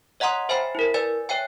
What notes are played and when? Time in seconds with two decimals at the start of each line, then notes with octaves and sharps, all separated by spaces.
0.20 C#5 D#5 F#5 A#5 C6 D#6
0.49 C5 E5 G5 G#5 B5
0.75 E4 A#4
0.94 B4 D5 G#5 A6
1.29 C#5 E5 G5 G#5